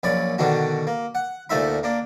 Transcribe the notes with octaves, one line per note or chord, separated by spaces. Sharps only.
A#1 F#2 C#5 D5 B5
B2 D3 D#3 D4 F#4
A#3
F#5
D2 A#2 A3 D#4 E5 B5
A#3 D4